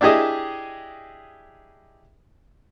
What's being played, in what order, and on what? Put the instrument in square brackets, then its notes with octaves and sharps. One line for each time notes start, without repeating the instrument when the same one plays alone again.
[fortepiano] D4 E4 G4 G#4 D#5